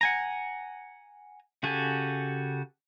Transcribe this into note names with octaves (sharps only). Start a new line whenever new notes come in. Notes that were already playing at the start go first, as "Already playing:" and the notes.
F#5 G#5 A#5
C#3 F#4 G4 A4 G#5